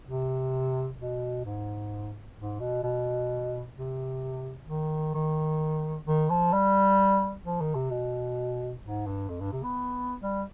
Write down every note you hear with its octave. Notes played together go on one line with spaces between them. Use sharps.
C3
B2
G#2
G#2
B2
B2
C3
D#3
D#3
D#3
F3
G3
F3
D#3
C3
B2
G#2
G2
F2
G2
C3
B3
G3